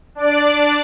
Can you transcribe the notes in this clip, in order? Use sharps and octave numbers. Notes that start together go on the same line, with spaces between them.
D4 D5